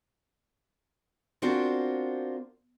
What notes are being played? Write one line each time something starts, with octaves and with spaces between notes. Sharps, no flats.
C4 D4 F4 F#4 A#4 C5